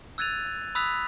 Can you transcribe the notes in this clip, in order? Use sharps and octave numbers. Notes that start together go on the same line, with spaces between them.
E6 F#6 G#6 A6 D#7 F7
B5 D#6 E6 F#6 B6 F7